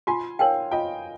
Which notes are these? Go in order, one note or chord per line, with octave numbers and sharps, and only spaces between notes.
F4 G#5 C6
A#4 C#5 F5 G5 G#5
F4 D#5 G5